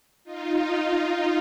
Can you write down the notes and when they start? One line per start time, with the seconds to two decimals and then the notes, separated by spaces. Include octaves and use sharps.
0.24 D#4 F4
0.76 D#4 F4